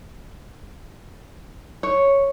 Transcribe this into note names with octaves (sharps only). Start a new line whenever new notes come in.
C#5